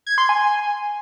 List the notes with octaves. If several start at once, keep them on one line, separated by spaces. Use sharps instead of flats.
G#6
C6
G#5